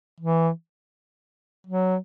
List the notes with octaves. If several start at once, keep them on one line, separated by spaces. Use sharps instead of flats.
E3
F#3